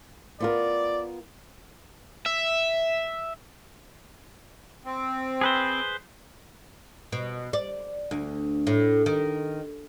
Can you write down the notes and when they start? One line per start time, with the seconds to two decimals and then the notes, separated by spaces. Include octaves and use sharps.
0.40 B3 F4 A#4 D5
2.26 E5
4.85 C4
5.41 G#4 B4 C5
7.12 B2
7.53 D5
8.11 D2
8.67 A2
9.06 D#3